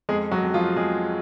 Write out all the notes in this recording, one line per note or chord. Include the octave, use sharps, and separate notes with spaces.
F2 G#3 G#4
F#3 F#4
F2
F3 F4
F2 G#3 G#4